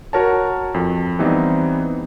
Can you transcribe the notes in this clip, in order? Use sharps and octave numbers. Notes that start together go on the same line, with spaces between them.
F#4 A#4 C#5 A5
F2
E3 G3 B3 C4 D#4